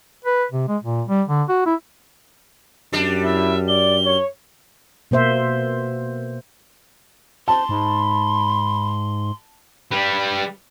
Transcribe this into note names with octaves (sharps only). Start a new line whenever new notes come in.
B4
C3
G#3
A#2
G3
D3
F#4
E4
F#2 G3 D4
E4 E5
D5 G7
C#5
B2 A#3 C5 E5
C5 A5 C6
G#2 B5
G3 B4